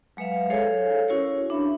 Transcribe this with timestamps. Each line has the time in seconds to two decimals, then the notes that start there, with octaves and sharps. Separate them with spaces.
0.17 F#3 G#3 B4 E5 F5
0.50 G#4 A4 C5 C#5 F5 G#5
1.09 C#4 E4 F#4 A#4 C#5
1.49 C#4 D4 E5 B5